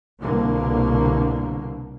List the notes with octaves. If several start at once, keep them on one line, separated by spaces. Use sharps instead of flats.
C2 B2 D3 A#3